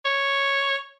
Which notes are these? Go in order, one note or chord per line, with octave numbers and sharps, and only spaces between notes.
C#5